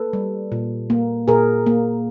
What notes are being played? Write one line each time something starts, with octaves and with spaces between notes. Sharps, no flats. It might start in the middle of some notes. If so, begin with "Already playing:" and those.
Already playing: A#3 A4 B4
G3
A#2
A#3
A#2 G#4 A#4
A#3